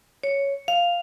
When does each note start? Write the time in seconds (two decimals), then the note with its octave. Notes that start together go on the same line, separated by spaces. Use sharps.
0.23 C#5
0.68 F5